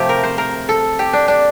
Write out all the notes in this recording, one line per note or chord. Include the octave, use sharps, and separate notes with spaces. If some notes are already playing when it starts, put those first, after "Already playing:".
Already playing: C3 F3 A3 G4
A#4
C5
A#4
A4
G4
D4
D4